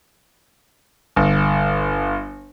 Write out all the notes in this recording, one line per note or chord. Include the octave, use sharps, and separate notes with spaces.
G1